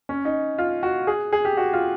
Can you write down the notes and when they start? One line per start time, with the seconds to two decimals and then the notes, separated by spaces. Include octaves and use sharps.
0.09 C#4
0.25 D#4
0.58 F4
0.83 F#4
1.07 G#4
1.32 G#4
1.45 G4
1.57 F#4
1.73 F4